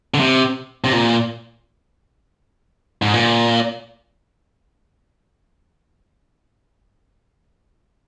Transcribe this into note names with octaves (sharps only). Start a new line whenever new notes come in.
D3
C3
C3
A#2
G#2
A#2